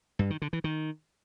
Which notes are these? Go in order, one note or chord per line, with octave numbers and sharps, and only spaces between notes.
G2
D#3
D3
E3
D#3